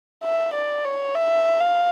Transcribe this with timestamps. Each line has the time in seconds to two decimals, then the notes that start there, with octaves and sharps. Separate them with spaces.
0.24 E5
0.54 D5
0.84 C#5
1.15 E5
1.60 F5